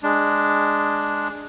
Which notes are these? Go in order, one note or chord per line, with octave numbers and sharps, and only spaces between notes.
G#3 D4